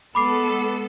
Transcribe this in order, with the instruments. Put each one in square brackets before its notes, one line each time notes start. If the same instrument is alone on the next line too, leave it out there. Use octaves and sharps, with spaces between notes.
[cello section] G#3 B3 A4 [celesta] B5 D6 C7